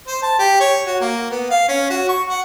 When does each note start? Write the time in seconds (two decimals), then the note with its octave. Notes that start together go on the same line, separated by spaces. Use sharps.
0.08 C5
0.23 A5
0.39 G4
0.60 C#5
0.86 F#4
1.01 A#3
1.30 B3
1.50 F5
1.68 C#4
1.90 F#4
2.09 C#6
2.29 F#5